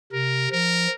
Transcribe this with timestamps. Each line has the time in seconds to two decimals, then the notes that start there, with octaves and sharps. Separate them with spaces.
0.13 C3 A#4
0.52 F3 A#4